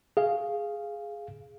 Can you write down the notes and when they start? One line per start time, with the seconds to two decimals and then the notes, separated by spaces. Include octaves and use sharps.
0.17 G#4 F5